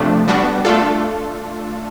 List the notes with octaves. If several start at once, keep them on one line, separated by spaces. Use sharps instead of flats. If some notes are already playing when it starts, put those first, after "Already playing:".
Already playing: C3 F3 A3 D4
G3 B3 D4 F#4
A3 D4 F4 A4